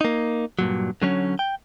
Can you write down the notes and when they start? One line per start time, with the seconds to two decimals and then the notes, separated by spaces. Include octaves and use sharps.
0.01 A#3 D#4
0.59 G2 A#2 F#3
1.02 D3 F#3 C#4
1.39 G5